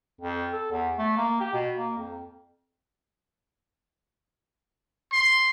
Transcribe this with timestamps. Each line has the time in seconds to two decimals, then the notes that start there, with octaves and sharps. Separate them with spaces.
0.21 F2
0.53 A4
0.72 E2
0.98 A3
1.17 A#3
1.40 G4
1.53 B2
1.77 A#3
1.98 F2
5.13 C6